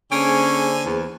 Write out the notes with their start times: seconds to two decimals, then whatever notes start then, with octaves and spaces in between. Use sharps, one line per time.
0.12 D3 A#3 C#4 G#4 C5 G#5
0.84 E2